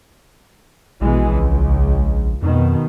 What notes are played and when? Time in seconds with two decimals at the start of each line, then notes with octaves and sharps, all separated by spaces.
1.01 A#1 B2 E3 G#3
1.31 C#2
2.42 F2 B2 D#3